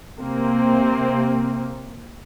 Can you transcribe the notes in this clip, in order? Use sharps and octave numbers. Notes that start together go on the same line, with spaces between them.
C3 A#3 C4